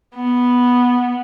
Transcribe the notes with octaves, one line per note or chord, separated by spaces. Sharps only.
B3